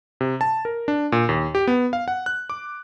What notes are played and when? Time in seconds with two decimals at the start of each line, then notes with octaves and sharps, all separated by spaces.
0.21 C3
0.41 A5
0.65 A#4
0.88 D4
1.12 A#2
1.29 D#2
1.55 G4
1.67 B3
1.93 F5
2.08 F#5
2.26 F#6
2.50 D6